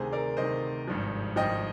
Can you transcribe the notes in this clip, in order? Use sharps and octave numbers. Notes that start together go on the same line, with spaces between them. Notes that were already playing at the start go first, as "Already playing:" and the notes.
Already playing: D2 C3 D#3 G#4 C5
A#4 D5
D2 C3 D#3 C5 D#5
G#1 G2 F3
G#1 G2 F3 D#5 G5